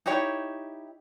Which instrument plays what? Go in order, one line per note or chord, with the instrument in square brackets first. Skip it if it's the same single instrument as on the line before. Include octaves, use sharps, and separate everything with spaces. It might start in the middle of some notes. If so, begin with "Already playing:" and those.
[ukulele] D#4 E4 G4 C#5